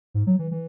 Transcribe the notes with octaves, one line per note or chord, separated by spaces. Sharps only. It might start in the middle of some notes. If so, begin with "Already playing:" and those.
G#2
F#3
E3
E3